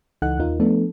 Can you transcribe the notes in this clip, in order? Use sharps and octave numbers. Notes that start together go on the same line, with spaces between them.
C#2 E3 D#4 A4 F#5 F#6
D#2 D#4 F4 A#4
F3 A3 B3 D4 A4